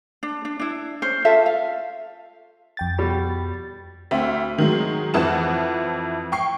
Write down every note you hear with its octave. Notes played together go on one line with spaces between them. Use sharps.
D4
D4
D4 E4
C#4 C5
F4 A4 E5
F5
F2 G5 A6
B2 G3
D2 C4 E5
D#3 F#3 G#3
F2 E3 F3 F#5 A5 E7
G5 C#6 C7